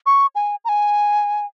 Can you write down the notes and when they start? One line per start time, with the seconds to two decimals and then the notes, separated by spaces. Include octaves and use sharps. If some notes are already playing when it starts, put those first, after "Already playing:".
0.06 C#6
0.35 G#5
0.65 A#5
0.69 G#5